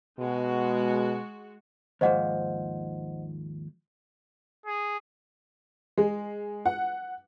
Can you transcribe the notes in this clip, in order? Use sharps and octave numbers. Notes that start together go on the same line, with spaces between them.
B2 G#3 F#4
D#2 G#2 F3 C5 D#5 F#5
G#4
G#3
F#5